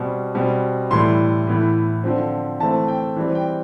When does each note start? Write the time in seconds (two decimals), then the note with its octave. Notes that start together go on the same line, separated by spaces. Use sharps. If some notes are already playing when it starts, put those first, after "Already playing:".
Already playing: B2 G3 C4
0.35 B2 G3 C4
0.91 A2 E3 G3 C6
1.47 A2 E3 B3
2.04 D3 F3 C4
2.60 E3 A3 C4 A5
2.88 G5
3.16 E3 G3 C4
3.35 G5